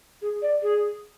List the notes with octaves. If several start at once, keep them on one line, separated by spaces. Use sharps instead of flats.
G#4
D5
G#4